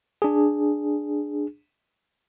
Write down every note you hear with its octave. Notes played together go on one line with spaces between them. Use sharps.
D4 G#4